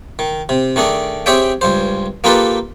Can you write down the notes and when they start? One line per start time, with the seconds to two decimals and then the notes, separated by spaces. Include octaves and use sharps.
0.19 D#3
0.49 C3
0.76 D#3 A3 D4 G#4
1.26 C4 G4 G#4 C#5 E5 G5
1.61 C#2 G2 C5
2.24 A#3 D#4 F4 G4 A4 B4